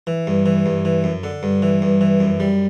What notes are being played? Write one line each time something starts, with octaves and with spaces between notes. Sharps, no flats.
E3
G2
E3
G2
E3
F#2
D3
G2
E3
G2
E3
F#2
G3